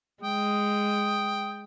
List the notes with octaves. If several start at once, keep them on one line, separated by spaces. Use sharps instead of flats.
G#3 G5 D#6